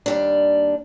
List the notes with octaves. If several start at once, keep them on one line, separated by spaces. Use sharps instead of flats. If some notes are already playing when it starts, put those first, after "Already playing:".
D#2 G3 D4